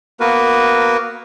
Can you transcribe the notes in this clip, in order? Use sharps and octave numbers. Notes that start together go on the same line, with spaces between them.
A#3 B3 F#4 A#4 B4